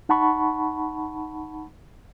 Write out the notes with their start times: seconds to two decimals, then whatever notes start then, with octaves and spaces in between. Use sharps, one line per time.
0.09 D#4 F#5 A5 B5 C#6